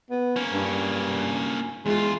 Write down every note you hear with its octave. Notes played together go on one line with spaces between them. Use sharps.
B3
A#3 C#4
G2
E2 G#3 F4